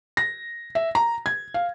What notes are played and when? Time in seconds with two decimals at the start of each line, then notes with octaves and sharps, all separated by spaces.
0.17 A#6
0.75 E5
0.95 A#5
1.26 G#6
1.54 F5